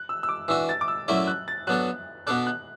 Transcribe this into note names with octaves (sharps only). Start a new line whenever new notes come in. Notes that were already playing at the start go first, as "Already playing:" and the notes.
Already playing: F#6
E6
E6
D6
E3 D4 F#4 E6
A6
D6
E6
F#2 F#3 A3 E4 D5
F#6
A6
F#3 B3 D4 A4 F#6
B2 B3 D4 A4 D5 F#6
F#6